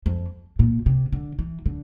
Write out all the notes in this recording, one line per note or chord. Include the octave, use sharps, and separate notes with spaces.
F2
A#2
C3
D3
E3
D3